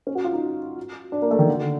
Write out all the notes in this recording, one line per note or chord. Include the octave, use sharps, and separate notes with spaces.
C#4
F#4
F4
D#4
D4
A#3
A3
D#3
D3
D3